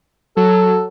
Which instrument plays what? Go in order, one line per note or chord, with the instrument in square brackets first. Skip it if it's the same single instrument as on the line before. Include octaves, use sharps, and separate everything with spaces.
[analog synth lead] F#3 [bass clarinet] A4